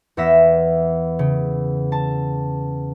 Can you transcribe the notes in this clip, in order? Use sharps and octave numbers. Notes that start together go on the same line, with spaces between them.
E2 B3 E5 A#6 B6 E7
C#3
A5